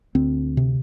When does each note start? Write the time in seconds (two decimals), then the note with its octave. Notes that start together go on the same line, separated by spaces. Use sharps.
0.15 D2 C4
0.57 C3